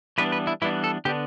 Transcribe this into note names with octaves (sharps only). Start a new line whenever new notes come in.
E3 G3 B3 D4 B4
B4
E4
E3 G3 B3 D4 E4
A4
D3 B3 D4 G4